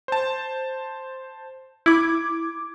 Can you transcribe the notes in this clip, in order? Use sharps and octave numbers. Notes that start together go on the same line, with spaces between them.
C5 A5
E4 D6 G#6